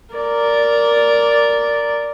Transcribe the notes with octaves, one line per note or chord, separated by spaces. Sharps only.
A#4 D5